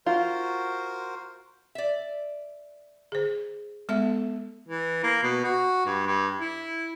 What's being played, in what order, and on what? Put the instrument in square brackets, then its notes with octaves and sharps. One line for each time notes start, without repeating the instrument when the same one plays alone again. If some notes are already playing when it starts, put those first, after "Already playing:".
[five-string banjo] F4 [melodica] F#4 A#4 C5
[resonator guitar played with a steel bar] D5 E5
[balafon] G#4 C5
[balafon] G#3 B3 E5 [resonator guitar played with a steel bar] A4
[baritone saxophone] E3
A#3
B2
F#4
G2
G2
E4